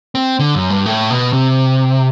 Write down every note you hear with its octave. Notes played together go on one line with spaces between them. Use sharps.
C4
D3
F#2
G2
A2
B2
C3